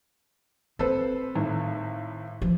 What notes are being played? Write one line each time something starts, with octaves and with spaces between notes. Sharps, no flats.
C4 A4 B4 C5
G#1 A2
E3 F3